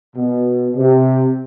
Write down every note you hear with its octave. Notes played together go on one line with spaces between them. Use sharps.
B2
C3